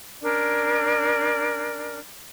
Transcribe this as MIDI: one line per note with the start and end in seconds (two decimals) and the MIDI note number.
0.22 1.99 61
0.22 1.99 62
0.22 1.99 70
0.22 1.99 74